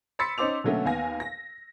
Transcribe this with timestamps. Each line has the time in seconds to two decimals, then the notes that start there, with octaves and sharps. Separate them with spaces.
0.19 B5 C6 E6 A6 B6 C#7
0.38 C#4 D#4 C5 C6 D6 F7
0.64 B2 D3 F#3 A3 A#3 C#4
0.85 D#2 B3 F5 G#5 A#6
1.20 A#6